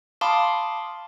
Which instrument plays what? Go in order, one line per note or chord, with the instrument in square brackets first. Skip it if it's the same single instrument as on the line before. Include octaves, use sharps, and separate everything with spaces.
[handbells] F5 A5 B5 C6 D6 D#6